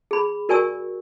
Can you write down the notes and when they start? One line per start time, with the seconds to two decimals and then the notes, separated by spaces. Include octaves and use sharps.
0.11 G#4 B5
0.49 F#4 A#4 D5 G#5 C#6 E6